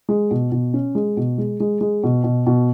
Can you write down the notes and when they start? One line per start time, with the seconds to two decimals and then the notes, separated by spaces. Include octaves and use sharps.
0.09 G#3
0.31 B2
0.52 B2
0.74 C#4
0.95 G#3
1.17 B2
1.38 G#3
1.60 G#3
1.81 G#3
2.04 B2
2.24 B2
2.47 B2